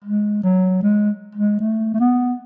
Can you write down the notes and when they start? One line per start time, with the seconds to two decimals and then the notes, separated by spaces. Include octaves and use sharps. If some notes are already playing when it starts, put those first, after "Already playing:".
0.04 G#3
0.43 F#3
0.82 G#3
1.35 G#3
1.60 A3
1.94 A3
2.00 B3